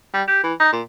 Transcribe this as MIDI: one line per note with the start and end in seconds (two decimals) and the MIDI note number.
0.14 0.23 55
0.28 0.39 67
0.44 0.54 52
0.60 0.72 63
0.73 0.82 46